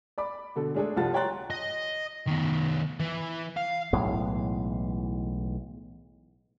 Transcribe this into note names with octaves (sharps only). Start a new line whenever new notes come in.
D5 B5 D6
B2 D3 A4
G#3 A3 D4 G#4 A4
C2 F3 F4 F#5 A5 A6
C#5 G5 A#5 C6 F#6 A6
D#5
D#3 B3
E3
F5
B1 A2 E3 G#3